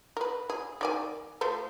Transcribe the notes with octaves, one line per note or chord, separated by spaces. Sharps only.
A#4 B4
G#4
D#3 D5 G#5
F3 A3 C5